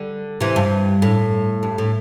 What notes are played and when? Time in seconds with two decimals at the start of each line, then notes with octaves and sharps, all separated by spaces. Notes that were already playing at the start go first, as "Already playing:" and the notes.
Already playing: D3 G3
0.41 C3 E3
0.56 G2
1.02 A2
1.63 G2
1.78 A2